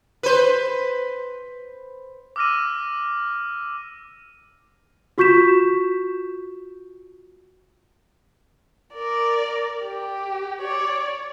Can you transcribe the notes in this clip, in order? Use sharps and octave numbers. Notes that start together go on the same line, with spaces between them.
B4 C5
D6 E6 F6 A#6 D#7
F4 F#4 C#6 G6 B6 E7
A#4 D5
G4
C#5 D5